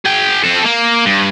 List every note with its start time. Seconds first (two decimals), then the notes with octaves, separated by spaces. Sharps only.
0.05 G#4 G5
0.44 C4 A4
0.64 A#3
1.05 G2